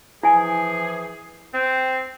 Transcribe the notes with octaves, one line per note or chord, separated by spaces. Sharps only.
E3 F3 E4 G#4 G#5
C4